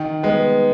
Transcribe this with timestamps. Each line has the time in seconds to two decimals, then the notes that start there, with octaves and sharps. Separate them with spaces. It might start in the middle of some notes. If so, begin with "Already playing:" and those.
Already playing: D#3
0.23 G#3 B3